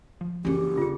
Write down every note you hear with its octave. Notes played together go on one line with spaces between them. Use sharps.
F3
F#1 E3 C#4 D4 G4 G#4
D#2 C#3 D4 F4 G#4